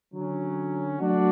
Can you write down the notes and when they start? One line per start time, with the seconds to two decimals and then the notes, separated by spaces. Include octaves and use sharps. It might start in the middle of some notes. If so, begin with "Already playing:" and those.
0.13 D3 F#3 C#4
0.99 F#3 A3 D4 F#4